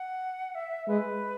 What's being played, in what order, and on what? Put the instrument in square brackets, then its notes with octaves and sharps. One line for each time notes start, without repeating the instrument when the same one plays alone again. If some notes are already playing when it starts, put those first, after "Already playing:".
Already playing: [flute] F#5
E5
[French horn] G#3 [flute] B4